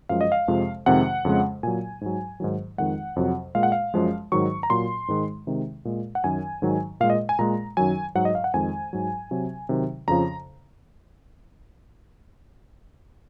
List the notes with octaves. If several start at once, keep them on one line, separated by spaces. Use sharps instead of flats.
F#2 F3 G#3 F5
D#5
F5
F2 C3 F3 G#3
F2 C3 D#3 G#3 F#5
F2 C#3 F3 G#3
A#2 F#3 G#5
G#2 F#3
G#2 D#3 F#3
F2 D#3 G#3 F#5
F2 C3 F#3
A#2 G#3 F5
F#5
F5
F#2 F3 G#3
G#2 D#3 F#3 C#6
A#5
A#2 F#3 C6
G#2 D#3 G#3
C3 D#3 G#3
A#2 G#3
F#5
F#2 D#3 F#3 G#5
G#2 D#3 F#3
A#2 G#3 F5
D#5
G#5
A#2 G#3 A#5
F#2 D#3 F#3 G#5
G#2 F#3 F#5
D#5
F5
F#5
F2 D#3 G#3 G#5
G#2 F#3
C3 F#3
C3 D#3 F#3
F2 C#3 F3 A#5